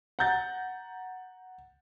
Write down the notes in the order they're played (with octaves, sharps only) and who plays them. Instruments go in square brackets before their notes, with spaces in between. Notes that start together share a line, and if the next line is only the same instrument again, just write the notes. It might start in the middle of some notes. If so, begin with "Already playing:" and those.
[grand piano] F#5 A#5 G6 A6